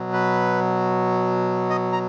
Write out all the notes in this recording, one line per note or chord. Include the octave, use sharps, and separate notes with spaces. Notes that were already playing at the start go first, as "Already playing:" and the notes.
Already playing: B2 F#3
B4
D#5
A#5